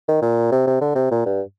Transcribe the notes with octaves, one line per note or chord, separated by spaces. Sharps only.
D#3
A#2
C3
C3
D3
C3
A#2
G2